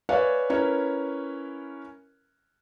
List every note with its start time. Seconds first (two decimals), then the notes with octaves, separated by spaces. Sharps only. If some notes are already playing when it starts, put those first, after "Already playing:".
0.09 B4 C#5 D5 E5 F5 G#5
0.50 C#4 E4 A#4 B4 C#5